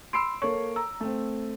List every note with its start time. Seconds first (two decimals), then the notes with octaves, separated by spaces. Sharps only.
0.13 B5 C6 E6 C7 D7
0.42 A#3 A4 C#5 C#6
0.76 A#5 E6
1.01 A3 C4